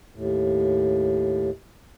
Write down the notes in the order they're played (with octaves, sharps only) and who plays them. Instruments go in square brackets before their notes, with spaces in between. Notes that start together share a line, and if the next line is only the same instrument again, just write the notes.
[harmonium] D#2 A2